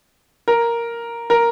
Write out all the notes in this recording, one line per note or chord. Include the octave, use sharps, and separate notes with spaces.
A#4
A#4